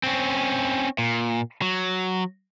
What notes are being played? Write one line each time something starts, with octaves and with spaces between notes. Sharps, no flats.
C4 C#4
A#2
F#3